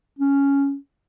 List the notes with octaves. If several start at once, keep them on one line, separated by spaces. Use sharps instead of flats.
C#4